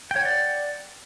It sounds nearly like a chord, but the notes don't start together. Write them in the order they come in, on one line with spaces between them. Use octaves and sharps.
G5 C#5 F#5 D5